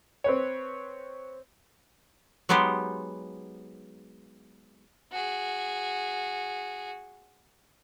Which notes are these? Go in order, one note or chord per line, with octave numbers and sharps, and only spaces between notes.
C4 B4 C#5
F#3 G#3 B3 D#4 G4 C5
F#4 G#4